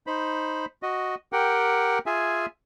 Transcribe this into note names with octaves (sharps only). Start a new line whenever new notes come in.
D#4 C5 B5
F#4 D#5
G4 A#4 F#5 G5
F4 G#4 E5 G#5